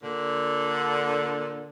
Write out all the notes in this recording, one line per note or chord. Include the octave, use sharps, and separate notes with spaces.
A#2 D3